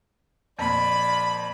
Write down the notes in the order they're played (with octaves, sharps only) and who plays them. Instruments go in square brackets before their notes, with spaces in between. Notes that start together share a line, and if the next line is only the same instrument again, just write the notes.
[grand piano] F2 A#2 [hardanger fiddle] D5 B5